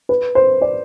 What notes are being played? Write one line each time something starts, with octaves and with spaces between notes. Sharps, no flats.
B4
C5
D5